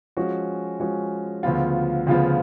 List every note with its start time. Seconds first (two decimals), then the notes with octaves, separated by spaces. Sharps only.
0.17 F3 G#3 C#4 F#4
0.80 F3 G#3 C#4 F#4
1.43 D2 C#3 F3 B3 F4
2.07 D2 C#3 F3 B3 F4